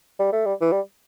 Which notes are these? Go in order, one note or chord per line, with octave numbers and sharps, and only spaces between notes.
G3
A3
G3
E3
G3